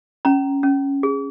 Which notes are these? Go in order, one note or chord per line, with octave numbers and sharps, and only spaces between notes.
C#4 A#5
C#4
G#4